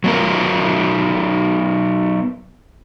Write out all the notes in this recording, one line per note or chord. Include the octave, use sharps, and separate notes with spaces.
F#3 B3 A#4